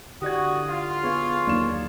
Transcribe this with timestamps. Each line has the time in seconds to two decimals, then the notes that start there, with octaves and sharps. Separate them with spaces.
0.22 D3 E4 F#4 G4 D5 D#6 G#6
0.69 F4
1.03 B3 G#4 C#5 F5
1.47 D#2 F#3 A#3 D5 E7